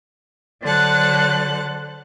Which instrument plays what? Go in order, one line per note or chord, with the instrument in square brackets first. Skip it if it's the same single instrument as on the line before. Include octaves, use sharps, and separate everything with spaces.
[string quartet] D3 F#3 C5 F#5 A5 F#6